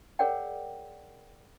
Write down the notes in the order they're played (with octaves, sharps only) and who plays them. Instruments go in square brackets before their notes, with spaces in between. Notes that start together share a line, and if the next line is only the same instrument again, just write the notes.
[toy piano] G#4 A#4 C#5 D5 F#5 G5